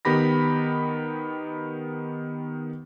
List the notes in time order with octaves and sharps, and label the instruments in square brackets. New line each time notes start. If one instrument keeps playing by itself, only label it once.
[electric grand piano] D#3 B3 G4 B5 A#6